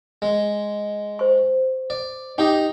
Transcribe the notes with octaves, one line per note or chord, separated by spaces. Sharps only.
G#3
C5 C#6
D5
D#4 G4 D#5 G5 D6